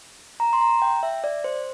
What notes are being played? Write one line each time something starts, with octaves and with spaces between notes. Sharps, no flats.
A#5
C6
A#5
G5
E5
D5
C5